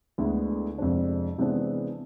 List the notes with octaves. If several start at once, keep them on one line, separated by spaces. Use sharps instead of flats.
D2 D3 G#3 B3 E4
F2 C3 G#3 D4
C3 E3 G#3 B3 D4